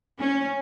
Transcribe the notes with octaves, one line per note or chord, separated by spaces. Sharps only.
C#4